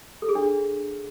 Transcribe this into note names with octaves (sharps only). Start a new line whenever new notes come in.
A4
G#4
D4